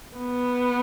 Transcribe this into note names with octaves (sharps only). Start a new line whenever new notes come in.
B3